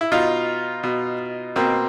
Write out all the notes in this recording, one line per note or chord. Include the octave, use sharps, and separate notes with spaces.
E4
B2 D#4 F4
B2
B2 A#3 C4